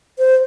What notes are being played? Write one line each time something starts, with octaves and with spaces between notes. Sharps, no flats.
C5